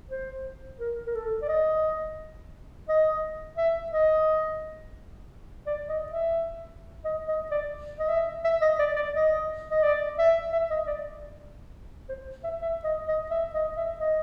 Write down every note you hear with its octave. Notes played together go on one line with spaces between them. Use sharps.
C5
A#4
A#4
A4
D5
D#5
D#5
E5
D#5
D5
D#5
E5
D#5
D#5
D5
D#5
E5
E5
D#5
D5
D5
D#5
D#5
D5
E5
E5
D#5
D5
C5
E5
E5
D#5
D#5
E5
D#5
E5
D#5